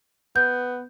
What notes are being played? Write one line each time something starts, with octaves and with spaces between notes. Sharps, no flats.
B3 G6